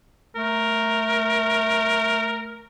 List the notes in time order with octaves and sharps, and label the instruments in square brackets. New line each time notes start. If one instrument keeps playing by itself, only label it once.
[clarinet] A3 [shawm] A#4